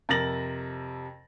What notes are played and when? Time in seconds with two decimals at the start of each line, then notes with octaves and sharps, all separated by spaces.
0.09 F2 C3 A#4 A6 A#6 F#7